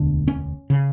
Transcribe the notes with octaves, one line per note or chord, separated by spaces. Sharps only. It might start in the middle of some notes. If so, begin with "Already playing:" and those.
Already playing: E1 D2 D3 D4
C#4
C#3